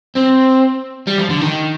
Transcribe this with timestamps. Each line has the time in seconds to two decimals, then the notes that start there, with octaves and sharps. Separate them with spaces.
0.17 C4
1.08 G3
1.19 F3
1.30 D3
1.41 D#3